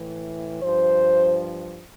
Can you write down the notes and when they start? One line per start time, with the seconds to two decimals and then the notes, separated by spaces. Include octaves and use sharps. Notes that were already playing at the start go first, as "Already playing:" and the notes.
Already playing: A2 E3
0.62 G2 F3 C5